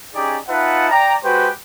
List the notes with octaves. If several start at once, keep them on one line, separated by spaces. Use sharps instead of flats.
C#4 D#4 G4 G#4 D5
D#4 F4 B4 E5 F#5 A5
D5 G5 A#5
G#3 F#4 G4 B4 C5 G5